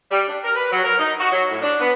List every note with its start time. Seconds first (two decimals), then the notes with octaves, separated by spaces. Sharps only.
0.11 G3
0.28 D4
0.44 A#4
0.55 B4
0.71 F#3
0.84 A#4
0.99 D#4
1.19 F#4
1.32 F#3
1.50 A2
1.62 D4
1.80 B3